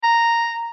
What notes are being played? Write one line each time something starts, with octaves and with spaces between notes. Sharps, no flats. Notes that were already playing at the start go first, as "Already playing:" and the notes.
A#5